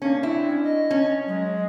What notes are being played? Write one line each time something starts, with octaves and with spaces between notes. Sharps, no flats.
A#3 C#4 D4
C4 E4
C#4
D#5
C#4
F#3 G#3